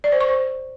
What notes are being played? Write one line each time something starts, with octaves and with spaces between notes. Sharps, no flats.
D5
C5
C#6
C5